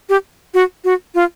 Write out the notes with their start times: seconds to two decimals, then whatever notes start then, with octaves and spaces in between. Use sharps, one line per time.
0.09 G4
0.54 F#4
0.84 F#4
1.15 F4